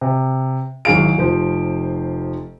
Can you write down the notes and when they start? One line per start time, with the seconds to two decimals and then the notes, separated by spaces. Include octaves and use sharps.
0.01 C3
0.85 G#1 F#3 E4 G#4 F5 D7
1.18 F1 F3 C5